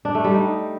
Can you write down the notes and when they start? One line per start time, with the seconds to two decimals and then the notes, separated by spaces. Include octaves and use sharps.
0.05 D4
0.15 A3
0.24 G3
0.34 D#4